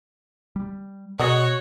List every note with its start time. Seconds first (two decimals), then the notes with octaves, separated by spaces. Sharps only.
0.56 G3
1.19 B2 G#3 B3 F#4 C#5 D#5